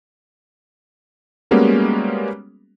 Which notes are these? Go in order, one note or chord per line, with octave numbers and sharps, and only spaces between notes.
G3 G#3 A#3 B3 C#4 F#4